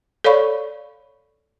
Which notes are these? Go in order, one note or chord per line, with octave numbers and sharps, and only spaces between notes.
A4 C#5 D5 F5 B5 C#6